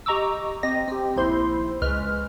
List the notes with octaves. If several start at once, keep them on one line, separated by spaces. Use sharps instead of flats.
G4 D#5 A#5 C#6 D6 E6
C4 G4 D#5 A#6
C4 G4
A#1 D#2 E4 C5 C6
C#2 G#3 B4 F6